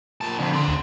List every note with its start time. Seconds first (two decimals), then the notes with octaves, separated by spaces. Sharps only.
0.21 A#2 A5
0.39 F2 D3
0.53 D4 C6
0.68 D2